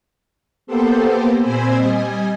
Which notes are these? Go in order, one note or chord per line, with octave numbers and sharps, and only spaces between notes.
A#3 B3 G4 A4 C5
A#2 C4 C5 G#5 B5 E6
G3 D#5 G#5